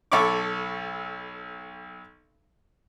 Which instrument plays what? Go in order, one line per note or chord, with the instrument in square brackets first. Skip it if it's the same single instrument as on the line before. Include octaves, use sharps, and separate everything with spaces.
[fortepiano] B1 A4 C#5 B5 C#6 D6